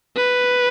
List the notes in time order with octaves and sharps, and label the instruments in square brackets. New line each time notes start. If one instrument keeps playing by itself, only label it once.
[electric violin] B4